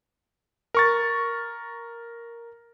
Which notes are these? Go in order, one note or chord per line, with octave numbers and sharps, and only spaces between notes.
A#4 C#6 A6